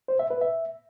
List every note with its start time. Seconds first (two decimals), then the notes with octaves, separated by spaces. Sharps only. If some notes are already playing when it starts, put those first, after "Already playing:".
0.08 C5
0.19 E5
0.30 B4
0.41 E5